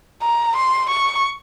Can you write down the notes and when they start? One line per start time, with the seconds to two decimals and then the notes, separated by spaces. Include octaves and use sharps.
0.22 A#5
0.56 C6
0.90 C#6